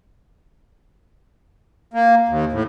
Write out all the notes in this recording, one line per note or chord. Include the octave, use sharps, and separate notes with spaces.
A#3
D#2
A2